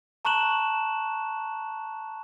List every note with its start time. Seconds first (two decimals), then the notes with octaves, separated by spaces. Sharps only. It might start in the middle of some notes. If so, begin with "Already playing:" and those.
0.25 A5 A#5 C#6 F#6 E7 F#7